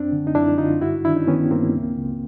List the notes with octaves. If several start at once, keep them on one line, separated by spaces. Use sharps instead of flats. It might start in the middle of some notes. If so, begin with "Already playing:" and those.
Already playing: F#2 C4 D4
D3
D#4
F#2 D4 E4
D3 D#4 F4
G2 E4 F#4
D#3 D4 E4
C#4 D#4
D#3 B3 C#4
G2 A#3 C4
C#2
C#2